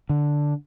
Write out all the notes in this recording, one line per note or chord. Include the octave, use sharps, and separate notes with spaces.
D3